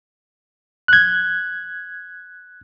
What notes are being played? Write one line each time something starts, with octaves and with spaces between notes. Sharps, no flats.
F#6 G#6